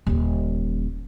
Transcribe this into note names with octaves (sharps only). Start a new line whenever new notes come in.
D#1 D3